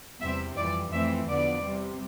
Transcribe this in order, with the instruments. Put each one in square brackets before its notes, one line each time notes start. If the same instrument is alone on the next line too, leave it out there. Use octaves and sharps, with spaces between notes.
[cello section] E2 C3 G3 C4 E5
F2 E3 G3 D5
F2 E3 A3 C4 E5
E2 D3 F3 B3 D5
C3 G3 C4